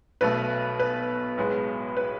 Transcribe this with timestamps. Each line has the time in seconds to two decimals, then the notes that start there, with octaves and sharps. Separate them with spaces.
0.21 B1 B2 A3 B4
0.80 B4
1.37 B1 A2 G#3 B3
1.97 B4